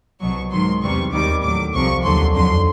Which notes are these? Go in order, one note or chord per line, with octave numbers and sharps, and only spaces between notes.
C2 B2 F#3 C#6
G#2 D#3 F#3 C6
E2 C3 E3 G3 C#6
D#2 D#3 G3 D6
A2 F#3 D6
C2 C3 F3 C#6
D#2 D3 F#3 C6
F2 D3 F#3 C6